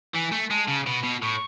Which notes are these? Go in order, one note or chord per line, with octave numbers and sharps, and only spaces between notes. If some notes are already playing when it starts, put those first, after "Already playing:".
E3 G#5
A3
G#3 A5
C#3
B2 B5
B2
A2 C#6